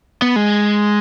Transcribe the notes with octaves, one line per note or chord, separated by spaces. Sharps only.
B3
G#3